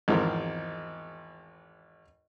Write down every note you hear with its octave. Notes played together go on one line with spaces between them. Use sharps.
G#1 E2 F3 C4 A#4